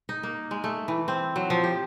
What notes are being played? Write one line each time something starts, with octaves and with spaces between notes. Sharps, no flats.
D#4
A#3
G#3
A3
E3
C4
F#3
F3
G4